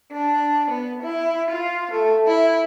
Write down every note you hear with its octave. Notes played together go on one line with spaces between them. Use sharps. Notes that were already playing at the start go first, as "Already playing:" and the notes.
D4
B3
E4
F4
A3
E4